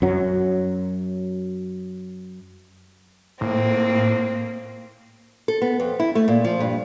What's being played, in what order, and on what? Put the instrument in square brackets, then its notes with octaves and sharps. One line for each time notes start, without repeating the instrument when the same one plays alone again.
[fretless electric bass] F#2 F#3
[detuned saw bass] A2 [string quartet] A#3 C4
[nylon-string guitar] A4
B3
F2
E4
A3
A#2
F3
G2